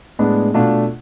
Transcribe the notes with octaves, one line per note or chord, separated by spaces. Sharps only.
A2 G#3 B3 D4
B2 A3 D4 F4